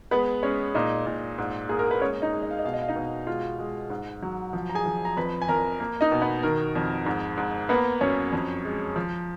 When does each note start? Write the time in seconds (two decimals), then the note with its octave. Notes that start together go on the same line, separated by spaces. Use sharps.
0.11 G#3 B3 B4
0.43 G#3 C#4 C#5
0.74 A#2 D#4 D#5
1.06 A#2
1.38 G#2
1.69 A#3 G#4
1.79 A#4
1.91 B4
2.00 G#3 C#4 C#5
2.22 D#4 D#5
2.33 G#3
2.43 D#5
2.51 F5
2.59 D#5
2.65 B2 F5
2.74 D#5
2.82 F5
2.88 D#4 D#5
2.96 B2
3.27 G#3 F4 F5
3.59 G#3
3.90 G#2
4.22 F#3
4.53 F3
4.69 A#5
4.75 G#4 G#5
4.86 F3
5.05 A#5
5.17 F2 B4 B5
5.42 G#5
5.49 F2 A#4 A#5
5.80 A#3
6.01 D#4 D#5
6.12 B2
6.22 B3 B4
6.43 D#3 A#4
6.75 F2
7.06 G#2
7.37 G#2
7.69 A#3 B3 B4
8.01 F#2 C#4 C#5
8.32 F2
8.65 G#3
8.96 F3